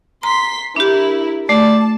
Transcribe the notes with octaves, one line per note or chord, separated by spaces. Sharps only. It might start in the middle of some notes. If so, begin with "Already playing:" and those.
A#5 C6 B6
D4 E4 G4 A#4
A3 D5 A5